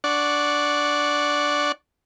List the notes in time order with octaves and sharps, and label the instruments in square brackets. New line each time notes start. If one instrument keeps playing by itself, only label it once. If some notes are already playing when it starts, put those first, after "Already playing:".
[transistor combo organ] D4 D5 F#5 C#6